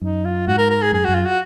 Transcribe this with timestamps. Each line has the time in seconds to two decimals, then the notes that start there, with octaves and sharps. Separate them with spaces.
0.01 F#2 D#4
0.25 F4
0.48 G#2 F#4
0.58 A#4
0.70 A#4
0.82 G#4
0.92 F#2 G#4
1.04 F#2 F#4
1.14 F4
1.26 F#4